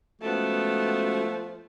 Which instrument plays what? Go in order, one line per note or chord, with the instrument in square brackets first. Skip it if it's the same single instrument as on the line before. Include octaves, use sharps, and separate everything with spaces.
[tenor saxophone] F3 [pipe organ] G#3 C#4 F#4 [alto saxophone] A3 [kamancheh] B3 A5